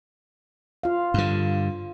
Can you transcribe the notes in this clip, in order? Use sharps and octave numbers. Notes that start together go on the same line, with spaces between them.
F4 F5
G2 D3